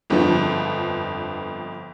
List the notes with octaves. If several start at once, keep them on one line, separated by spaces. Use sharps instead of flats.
G1 F2 D3 F3 B3